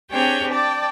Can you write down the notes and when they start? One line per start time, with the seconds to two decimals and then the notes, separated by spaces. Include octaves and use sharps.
0.11 C4 D4 G4 G#4 C#5 G5
0.50 D5 G5 A5